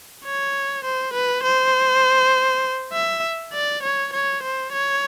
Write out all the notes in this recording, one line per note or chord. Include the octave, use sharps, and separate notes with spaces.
C#5
C5
B4
C5
E5
D5
C#5
C#5
C5
C#5